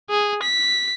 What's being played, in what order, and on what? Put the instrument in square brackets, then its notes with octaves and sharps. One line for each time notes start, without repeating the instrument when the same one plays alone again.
[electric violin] G#4
B6